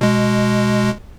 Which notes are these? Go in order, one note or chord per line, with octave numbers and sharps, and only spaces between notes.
B2 G#3